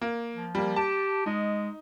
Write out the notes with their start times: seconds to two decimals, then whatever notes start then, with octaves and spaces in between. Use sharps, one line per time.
0.01 A#3
0.35 F3
0.55 G3 A#3
0.76 G4 A5
1.26 G#3 D#4